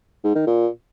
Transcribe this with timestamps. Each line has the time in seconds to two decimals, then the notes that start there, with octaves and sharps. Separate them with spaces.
0.24 G#2
0.36 D#3
0.47 A#2